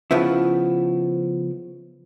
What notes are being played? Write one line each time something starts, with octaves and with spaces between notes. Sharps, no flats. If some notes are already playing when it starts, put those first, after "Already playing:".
C#3 F3 B3 E4